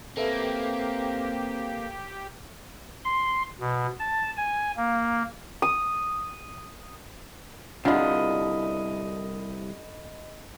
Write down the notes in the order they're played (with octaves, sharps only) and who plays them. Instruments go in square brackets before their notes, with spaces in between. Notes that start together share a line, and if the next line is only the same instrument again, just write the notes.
[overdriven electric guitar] A#3 [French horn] C4 [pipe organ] G4 [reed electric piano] A4 B4 E5
[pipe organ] C6
B2
A5
G#5
A#3
[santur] D#6
[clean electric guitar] C2 [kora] D3 F4 [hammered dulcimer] D#5 B5